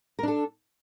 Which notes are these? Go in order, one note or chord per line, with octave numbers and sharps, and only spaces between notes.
D4 A4 A#4